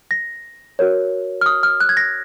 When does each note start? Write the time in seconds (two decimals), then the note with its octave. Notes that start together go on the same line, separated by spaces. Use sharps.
0.11 A#6
0.79 F#4 A#4 C#5
1.41 F6
1.46 D#6
1.63 F6
1.81 F#6
1.89 G#6
1.97 A#6